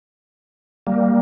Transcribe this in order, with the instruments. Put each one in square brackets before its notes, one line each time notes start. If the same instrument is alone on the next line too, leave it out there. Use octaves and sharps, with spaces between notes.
[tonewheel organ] G3 A#3